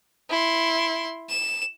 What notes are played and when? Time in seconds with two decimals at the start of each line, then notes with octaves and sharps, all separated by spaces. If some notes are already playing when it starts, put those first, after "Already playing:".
0.30 E4 C6
1.29 E7